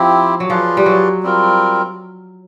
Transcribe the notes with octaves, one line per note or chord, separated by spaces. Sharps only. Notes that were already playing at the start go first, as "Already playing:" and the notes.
Already playing: F3 C4 E4 G4
F#3
F3 F4 G#4 B4 D5
G3
F#3
G3 C4 F4 A#4